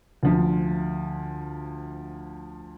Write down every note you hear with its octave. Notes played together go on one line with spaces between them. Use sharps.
D2 F3